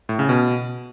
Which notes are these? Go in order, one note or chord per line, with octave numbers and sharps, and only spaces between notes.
A2
C#3
B2